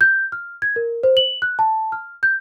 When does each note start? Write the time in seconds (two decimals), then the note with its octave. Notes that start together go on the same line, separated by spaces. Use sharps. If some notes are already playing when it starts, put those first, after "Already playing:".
0.01 G6
0.32 F6
0.62 G#6
0.76 A#4
1.03 C5
1.17 F#7
1.42 F#6
1.59 A5
1.92 F6
2.23 G6